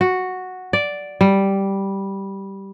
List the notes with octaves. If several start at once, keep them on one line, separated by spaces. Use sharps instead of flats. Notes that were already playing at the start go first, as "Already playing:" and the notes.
F#4
D5
G3